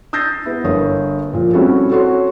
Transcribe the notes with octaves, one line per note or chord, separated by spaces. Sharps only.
D#6 E6 G6 A6 A#6 C7
B3 E4
G1 A#3 C#5 D#6
A#2 F3
G3 C4 C#4 E4 F#4 A4
F#4 A4 C#5 C6